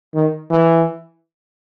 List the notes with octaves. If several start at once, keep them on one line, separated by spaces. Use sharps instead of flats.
D#3
E3